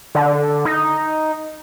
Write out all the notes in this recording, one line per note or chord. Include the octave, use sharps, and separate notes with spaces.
D3
D#4